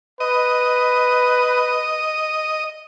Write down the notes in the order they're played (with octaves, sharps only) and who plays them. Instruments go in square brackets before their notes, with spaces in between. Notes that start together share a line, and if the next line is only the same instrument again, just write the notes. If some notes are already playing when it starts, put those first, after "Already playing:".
[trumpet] B4 [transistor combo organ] D#5